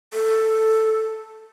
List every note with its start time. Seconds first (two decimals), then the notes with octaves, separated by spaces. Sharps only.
0.13 A4